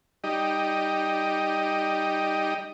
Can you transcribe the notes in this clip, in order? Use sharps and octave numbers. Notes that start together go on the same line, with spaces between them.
G3 D#4 G4 D5 D#5